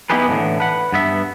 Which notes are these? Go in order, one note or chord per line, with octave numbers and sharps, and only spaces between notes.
B3 D#4 E4 G4 G#4 B4
D2 A2 D3 E3
B4 F#5
G2 B3 E5